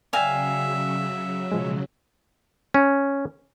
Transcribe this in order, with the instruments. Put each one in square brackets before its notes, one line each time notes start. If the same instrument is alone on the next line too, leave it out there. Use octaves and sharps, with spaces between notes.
[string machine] C#3 F#3 [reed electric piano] D5 G5 [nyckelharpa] E5 [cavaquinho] F5 G#5
[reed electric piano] B2 F3 G#3
[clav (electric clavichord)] C#4